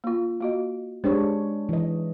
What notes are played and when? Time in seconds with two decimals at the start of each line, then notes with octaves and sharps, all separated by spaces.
0.04 A#3 F4
0.41 A#3 F#4 D#5
1.04 G#3 D4 G4 C5 C#5
1.69 E3 D#5